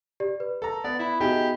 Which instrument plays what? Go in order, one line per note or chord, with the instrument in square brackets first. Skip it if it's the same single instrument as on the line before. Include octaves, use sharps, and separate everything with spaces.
[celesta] G4 D5
B4
[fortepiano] A4 A#5
[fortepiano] B3 [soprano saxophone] D5
[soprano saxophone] E4 [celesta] E5 B5
[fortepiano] B2 D#4 G#4 [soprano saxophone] G4